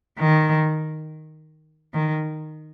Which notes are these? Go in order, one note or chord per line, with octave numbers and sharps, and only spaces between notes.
D#3
D#3